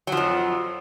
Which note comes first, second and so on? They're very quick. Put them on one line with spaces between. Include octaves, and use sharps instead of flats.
F#3 F3 F2